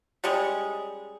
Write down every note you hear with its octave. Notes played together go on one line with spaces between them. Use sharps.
G3 G#3 C#4 G#4